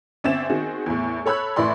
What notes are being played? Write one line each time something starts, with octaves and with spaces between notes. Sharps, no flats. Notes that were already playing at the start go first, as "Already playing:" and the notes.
G1 C4 C#4 E5 A6 E7
D#3 C4 F#4 G#4
E2 A2
A4 C#5 B5 E6 F#6
A1 A2 E3 D5 B5 C6